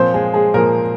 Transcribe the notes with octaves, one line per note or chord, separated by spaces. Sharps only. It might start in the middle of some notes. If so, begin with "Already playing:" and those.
Already playing: A#2 F3 C4 C5
G#3 G#4
G#3 G#4
A#2 F3 A#3 A#4